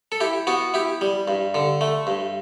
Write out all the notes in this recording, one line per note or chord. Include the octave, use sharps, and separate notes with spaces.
A4
E4 G4
B3 F#4
E4 G4
G3
G2
D3
A3
G2